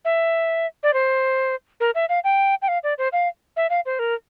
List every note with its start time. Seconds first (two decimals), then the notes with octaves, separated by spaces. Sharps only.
0.05 E5
0.83 D5
0.93 C5
1.80 A#4
1.95 E5
2.09 F5
2.24 G5
2.62 G5
2.68 F5
2.83 D5
2.98 C5
3.13 F5
3.56 E5
3.70 F5
3.86 C5
3.99 A#4